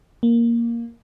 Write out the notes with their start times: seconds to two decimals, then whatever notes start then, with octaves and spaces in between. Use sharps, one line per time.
0.23 A#3